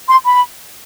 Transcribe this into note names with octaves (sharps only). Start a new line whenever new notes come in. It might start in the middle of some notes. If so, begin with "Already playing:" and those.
C6
B5